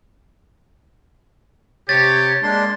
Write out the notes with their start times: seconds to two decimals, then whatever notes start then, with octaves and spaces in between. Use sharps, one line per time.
1.89 C3 G4 C#5 A6
2.43 G#3 A#3 D4 C6